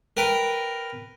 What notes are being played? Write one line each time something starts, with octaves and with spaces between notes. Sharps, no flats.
A#4 B4 G5